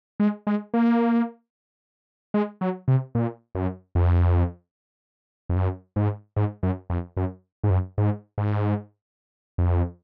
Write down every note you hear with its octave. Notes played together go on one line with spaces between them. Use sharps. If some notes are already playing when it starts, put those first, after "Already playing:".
G#3
G#3
A#3
G#3
F#3
C3
A#2
F#2
F2
F2
F#2
G#2
G#2
F#2
F2
F#2
G#2
F#2
G#2
G#2
F2